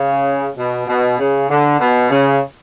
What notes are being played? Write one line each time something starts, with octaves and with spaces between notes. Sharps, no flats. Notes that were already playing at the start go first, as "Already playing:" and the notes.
Already playing: C#3
B2
B2
C#3
D3
B2
C#3